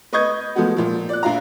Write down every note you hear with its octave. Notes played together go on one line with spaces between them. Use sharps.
B4 D#5 C#6 D#6 G6 G#6
F3 G#3 A3 B3 F#4
A#2 F3
D5 F#6
A#1 F4 F5 A#5